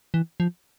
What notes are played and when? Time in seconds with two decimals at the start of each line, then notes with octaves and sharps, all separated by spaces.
0.14 E3
0.40 F3